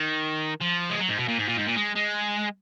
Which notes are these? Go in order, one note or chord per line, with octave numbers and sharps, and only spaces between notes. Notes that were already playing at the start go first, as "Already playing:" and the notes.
Already playing: D#3
F3
G#3
F#3
G#2
B2
A#2
G#2
A#2
G#2
A#2
G#3
G#3